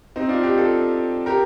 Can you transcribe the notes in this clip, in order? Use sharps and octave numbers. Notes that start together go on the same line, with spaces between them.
C4 D#4
D4 F4
D#4 G4
F4 A4
G4 A#4